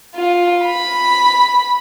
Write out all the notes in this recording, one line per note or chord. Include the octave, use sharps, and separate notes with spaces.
F4
B5